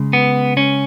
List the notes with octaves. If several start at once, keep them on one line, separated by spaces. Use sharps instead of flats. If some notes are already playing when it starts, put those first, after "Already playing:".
Already playing: C#3 G#3
B3
C#4